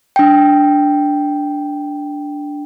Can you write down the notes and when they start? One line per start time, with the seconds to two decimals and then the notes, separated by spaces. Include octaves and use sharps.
0.16 D4 G5